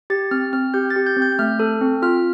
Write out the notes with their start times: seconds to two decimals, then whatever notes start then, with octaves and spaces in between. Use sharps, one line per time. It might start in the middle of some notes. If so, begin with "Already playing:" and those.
0.10 G4 A6
0.31 C4 F6
0.53 C4 F6
0.74 G4 G6
0.90 A6
0.96 G4
1.06 G6
1.16 C4
1.22 G6
1.32 G6
1.39 A3 F6
1.60 A4
1.81 C4
2.02 F4 F6